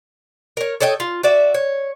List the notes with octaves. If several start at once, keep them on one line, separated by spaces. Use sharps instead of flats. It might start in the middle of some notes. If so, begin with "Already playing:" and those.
A#4 C#5
A4 C#5 D#5 G5
F4
F#4 D5 E5
C#5